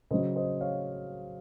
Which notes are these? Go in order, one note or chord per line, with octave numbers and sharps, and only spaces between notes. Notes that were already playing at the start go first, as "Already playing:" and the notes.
C#3 F#3 C5 D#5
C5 D#5
C#5 F5